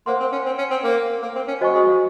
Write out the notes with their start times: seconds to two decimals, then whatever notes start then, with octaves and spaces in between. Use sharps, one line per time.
0.06 A#3 C5 F#5 C6
0.20 C4
0.32 C#4
0.46 C4
0.58 C#4
0.70 C4
0.84 A#3
1.22 A#3
1.35 C4
1.48 C#4
1.61 F#3 F#4 C5 D#5 G#5 C#6
1.74 G#3
1.87 F3